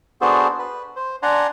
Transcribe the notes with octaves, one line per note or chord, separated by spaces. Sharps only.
B3 D4 F#4 G#4 A4 C5
B4
C5
D4 D5 F#5 G#5 A#5 C6